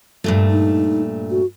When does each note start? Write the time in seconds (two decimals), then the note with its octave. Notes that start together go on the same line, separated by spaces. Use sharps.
0.24 G2 A#2 A3
0.50 D#4
1.30 F#4